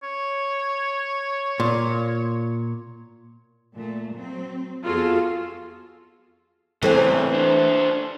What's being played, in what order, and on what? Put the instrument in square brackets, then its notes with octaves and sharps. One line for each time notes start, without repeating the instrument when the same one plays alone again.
[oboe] C#5
[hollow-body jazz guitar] A#2
[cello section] A#2 A3
F#3 C4
[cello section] F2 B3 F#4 [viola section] F4 G#4 A4
[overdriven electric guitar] A2 C#3 [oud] E3 A3 C4
[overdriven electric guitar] D4 C5